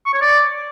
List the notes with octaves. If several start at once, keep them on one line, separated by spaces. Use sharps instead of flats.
C#6
C#5
D5